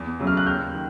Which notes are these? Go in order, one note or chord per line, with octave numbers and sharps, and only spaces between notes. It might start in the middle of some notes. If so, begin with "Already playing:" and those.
Already playing: E2
C#3 F#3 A3
F6
F#6
D#2 F6 G6
D#3